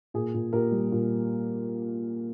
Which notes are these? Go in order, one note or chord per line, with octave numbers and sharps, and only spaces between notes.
A#2 G#4
A#2
A#2 G4 A#4
G3
A#2